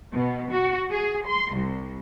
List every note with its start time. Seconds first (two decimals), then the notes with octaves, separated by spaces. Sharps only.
0.14 B2
0.53 F#4
0.91 G#4
1.26 C6
1.55 C2